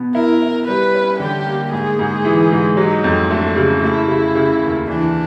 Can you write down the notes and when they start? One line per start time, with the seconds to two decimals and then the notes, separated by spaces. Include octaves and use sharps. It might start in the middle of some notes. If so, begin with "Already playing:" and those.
Already playing: B2 B3
0.15 E4 A#4
0.42 E4
0.68 G3 B4
0.95 C#4
1.20 D3 G4
1.46 A#3
1.72 G#2 G#4
1.99 G#2
2.25 E3
2.52 G#2
2.77 F#3 D#4
3.04 F2
3.30 A3 D4
3.56 C#3
3.83 A3 E4
4.08 C#3
4.35 C#3
4.62 D#2
4.88 E3 D4